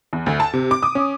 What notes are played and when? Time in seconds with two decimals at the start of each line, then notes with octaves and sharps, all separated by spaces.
0.13 E2
0.26 D2
0.40 A5
0.54 C3
0.71 D6
0.83 D#6
0.95 C#4